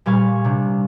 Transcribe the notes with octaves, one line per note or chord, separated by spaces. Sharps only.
A#2 G3 F5 G#5 C#6
C3 D4